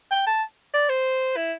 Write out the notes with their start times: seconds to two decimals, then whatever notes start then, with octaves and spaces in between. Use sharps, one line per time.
0.11 G5
0.27 A5
0.74 D5
0.89 C5
1.36 E4